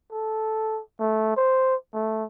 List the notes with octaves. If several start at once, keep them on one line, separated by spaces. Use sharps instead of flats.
A4
A3
C5
A3